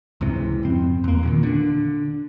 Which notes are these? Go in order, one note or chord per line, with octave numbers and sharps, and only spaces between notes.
C#2 G#2 C3 E3
F2 C4
E2 A#3
A#2 D3 D#3
D3 D4